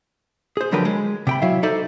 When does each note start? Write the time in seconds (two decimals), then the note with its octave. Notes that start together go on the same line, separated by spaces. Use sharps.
0.57 G#4 C5
0.72 D3 F3 F#3 A#4 B4 G5
0.85 G#3
1.27 C3 G5 B5
1.42 F#3 E4 E5 F5
1.63 D#4 A4 C5 D5 E5